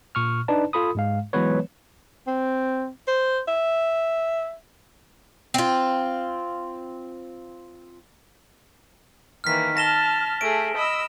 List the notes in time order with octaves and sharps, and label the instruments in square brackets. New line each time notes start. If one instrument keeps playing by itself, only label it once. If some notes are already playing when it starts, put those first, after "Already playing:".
[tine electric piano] A#2 C#6 F6
D4 D#4 B4 D5 A5
F4 A4 B5 D#6
G#2 G#3 F5
E3 F#3 G#3 B3 B4 C#5
[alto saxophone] C4
C5
E5
[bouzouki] C4 F4
[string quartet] D#3 E3 A#3 [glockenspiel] F6 B6
[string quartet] A5 F6 [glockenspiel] A#6 E7 G7
[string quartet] A3 G#4 A4 [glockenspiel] D7
[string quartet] D#5 B5 E6